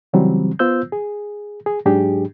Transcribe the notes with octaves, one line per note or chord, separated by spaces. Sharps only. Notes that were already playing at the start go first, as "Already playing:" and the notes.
C#3 E3 F#3 G3 C4
B3 F4 C5 E6 G6
G#4
G#4
G#2 F#3 D4 G4 G#4